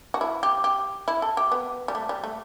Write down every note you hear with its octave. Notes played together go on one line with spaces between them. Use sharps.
F#4
E4
G4
G4
E4
A4
G4
B3
G3
A3
G3
A3